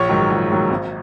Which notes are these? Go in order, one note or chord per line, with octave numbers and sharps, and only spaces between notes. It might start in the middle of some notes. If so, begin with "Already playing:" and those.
Already playing: A#1 C#5 C#6
G#2 D#3 F#3
A#1
G#2 D#3 F#3
G#1